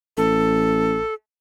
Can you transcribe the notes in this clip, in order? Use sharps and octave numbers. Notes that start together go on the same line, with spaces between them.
A1 A4